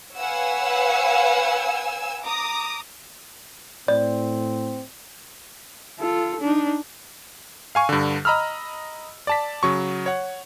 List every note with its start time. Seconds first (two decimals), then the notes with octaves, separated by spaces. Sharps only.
0.18 B4 C#5 F5 F#5 G#5 E6
2.23 A#5 D6 D#6
3.88 A2 C4 D5
5.99 F4 A4
6.41 D4 D#4
7.75 F5 G#5 C#6
7.89 G2 D3
8.25 D#5 A#5 B5 E6 F6
9.27 D5 A5 B6
9.63 C#3 F#3 C#6
10.06 C#5 F#5